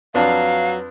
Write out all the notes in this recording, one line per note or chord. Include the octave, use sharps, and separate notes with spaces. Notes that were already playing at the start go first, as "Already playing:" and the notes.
F2 F#3 D4 B4 F5